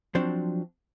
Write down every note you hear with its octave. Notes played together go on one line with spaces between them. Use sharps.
F3 F#3 C4 D4